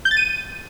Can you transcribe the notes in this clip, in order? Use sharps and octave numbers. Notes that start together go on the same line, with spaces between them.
G6
A6
D#7